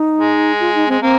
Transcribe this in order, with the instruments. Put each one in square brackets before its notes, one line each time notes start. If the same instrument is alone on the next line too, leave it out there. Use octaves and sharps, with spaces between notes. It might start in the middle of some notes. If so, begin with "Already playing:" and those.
Already playing: [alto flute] D#4
[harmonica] G#3
[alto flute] F4
D#4
[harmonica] G#3 [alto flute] C4
[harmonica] A#3 [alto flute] C4